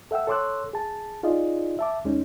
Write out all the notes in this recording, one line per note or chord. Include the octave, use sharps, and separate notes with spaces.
A4 E5 F#5 G5 E6
A4 C#5 C6 D6 E6 F#6
G#4 A5
D#4 F4 G#4 D5 D#5
E5 A5 D6
D#2 G#3 C#4 D#4